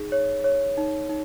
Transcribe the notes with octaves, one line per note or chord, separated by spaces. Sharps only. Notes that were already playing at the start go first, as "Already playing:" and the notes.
Already playing: D#4 G#4
C#5
C#5
D#4
D#4